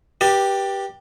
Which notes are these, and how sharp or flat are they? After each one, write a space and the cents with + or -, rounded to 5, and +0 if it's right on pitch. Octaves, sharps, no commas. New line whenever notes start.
G4 +0 B4 -25 D5 +15